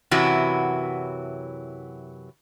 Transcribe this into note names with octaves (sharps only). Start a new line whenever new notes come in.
F#2 C3 E3 F#3 E4 F#4